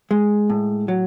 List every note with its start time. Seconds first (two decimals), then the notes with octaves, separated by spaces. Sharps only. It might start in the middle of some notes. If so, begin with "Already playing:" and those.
0.11 G#3
0.50 A2
0.88 F#3